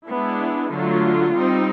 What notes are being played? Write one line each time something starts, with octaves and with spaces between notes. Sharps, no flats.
G#3 B3 D4 E4
D3 F#3 A3 F4
G3 C4 D#4